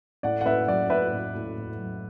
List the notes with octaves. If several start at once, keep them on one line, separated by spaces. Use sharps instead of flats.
A2 D5 F#5
F#5
A2 B4 E5
F#3 D5
A2 B4 E5
A2
A2
A2
F#3